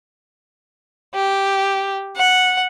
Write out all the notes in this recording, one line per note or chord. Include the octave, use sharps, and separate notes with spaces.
G4
F#5